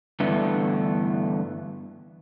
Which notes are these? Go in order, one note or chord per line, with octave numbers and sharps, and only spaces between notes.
G2 D3 E3 A3 B3